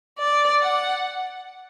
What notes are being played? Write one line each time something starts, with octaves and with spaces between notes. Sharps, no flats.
D5
F#5